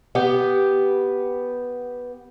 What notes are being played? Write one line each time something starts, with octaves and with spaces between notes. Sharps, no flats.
B3 G4